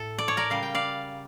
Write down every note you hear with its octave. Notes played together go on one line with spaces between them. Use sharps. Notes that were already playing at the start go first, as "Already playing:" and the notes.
Already playing: A2 A4
D5
C#5
A#4 D5
C#3 G3 F5
G5
D5 F5